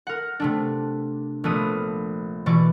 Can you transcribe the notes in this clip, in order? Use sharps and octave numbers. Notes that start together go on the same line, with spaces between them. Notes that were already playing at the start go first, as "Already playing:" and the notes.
A#4 F#5
C3 A3 D4
A#1 F3 A3 B3 D#6 D#7
B2 E3 D5 C#6